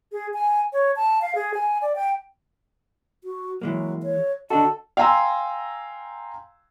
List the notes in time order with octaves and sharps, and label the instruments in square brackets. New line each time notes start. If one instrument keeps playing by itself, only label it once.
[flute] G#4
G#5
C#5
A5
F5
G#4
G#5
D5
G5
[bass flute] F#4
[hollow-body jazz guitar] E3 G#3 A#3 [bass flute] F#3
[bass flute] C#5
[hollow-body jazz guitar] D3 D4 F#4 [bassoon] A4 [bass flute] D#5
[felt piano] F5 G5 G#5 A#5 C6 E6